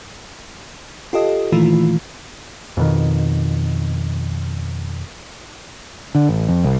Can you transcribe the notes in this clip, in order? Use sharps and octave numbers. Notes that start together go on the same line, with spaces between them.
F4 G4 A4 D#5
A#2 D#3 E3 A3 F4
F2 B2 D#3
D3
A1
F2
C2